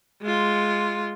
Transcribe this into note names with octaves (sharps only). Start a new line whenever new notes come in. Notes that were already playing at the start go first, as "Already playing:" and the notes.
G#3 F4